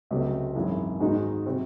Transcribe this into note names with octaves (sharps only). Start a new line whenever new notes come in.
C#2 C3 F#3 A3
G#1 F#2 E3 G#3
G#2 D#3 G#3 D#4 F#4
C3 F#3 C4 F#4